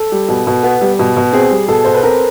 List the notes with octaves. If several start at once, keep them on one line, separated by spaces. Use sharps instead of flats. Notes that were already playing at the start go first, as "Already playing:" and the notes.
Already playing: A4
G3
B2
B2
B3
G3
B2
B2
C4 G#4
G3
B2 A4
B2 C5
B4
C4 A#4